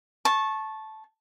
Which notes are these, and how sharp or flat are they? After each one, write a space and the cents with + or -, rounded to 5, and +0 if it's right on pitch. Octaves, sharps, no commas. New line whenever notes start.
A5 -10 C#6 -20